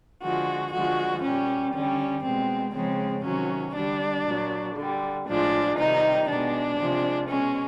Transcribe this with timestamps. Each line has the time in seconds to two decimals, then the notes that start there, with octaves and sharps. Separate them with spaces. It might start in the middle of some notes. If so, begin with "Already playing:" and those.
0.22 D3 F3 G#3 F#4
0.72 D3 F3 G#3 F#4
1.22 A#2 G3 C#4
1.73 D3 G3 C#4
2.23 B2 G#3 C4
2.73 C#3 F3 G#3 C4
3.24 C3 D#3 F#3 C#4
3.75 D3 G3 D4
4.25 A#2 F#3
4.76 D3 G3
5.26 A2 F3 G#3 D4
5.77 C3 D#3 G3 D#4
6.27 B2 G#3 D4
6.78 C3 F3 G#3
7.28 B2 G#3 C#4